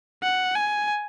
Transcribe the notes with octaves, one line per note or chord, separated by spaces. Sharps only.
F#5
G#5